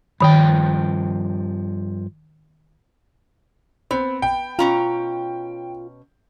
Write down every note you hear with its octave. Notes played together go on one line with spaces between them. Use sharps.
G2 D#3 F3 G5 B5
B3 C4
G5
B2 C#4 F4 A#5